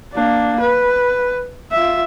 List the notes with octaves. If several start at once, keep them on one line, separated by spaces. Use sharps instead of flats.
A#3 D4
B4
F4 E5